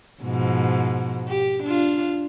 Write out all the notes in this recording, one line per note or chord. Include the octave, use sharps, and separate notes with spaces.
G#2 B2 F3
G4
D4 F4